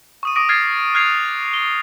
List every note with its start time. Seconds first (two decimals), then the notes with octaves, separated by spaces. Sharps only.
0.23 C#6 D#6 D#7
0.35 D6 D#6 A#6 D7 D#7
0.49 F6 G#6 A6 C7
0.95 F6 F#6 G#6 C7 F7
1.54 G7